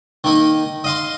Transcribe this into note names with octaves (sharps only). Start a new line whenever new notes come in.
D#3 A#3 D#4
D#5 F5 C6